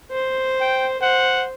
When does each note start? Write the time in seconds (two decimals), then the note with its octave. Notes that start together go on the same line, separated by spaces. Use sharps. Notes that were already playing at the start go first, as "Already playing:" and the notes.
0.11 C5
0.61 G5
1.02 C5 F#5